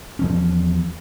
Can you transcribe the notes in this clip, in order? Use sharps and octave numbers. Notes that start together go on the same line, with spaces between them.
E2 F3 C#4